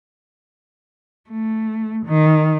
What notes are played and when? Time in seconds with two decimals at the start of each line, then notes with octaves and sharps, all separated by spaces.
1.30 A3
2.06 D#3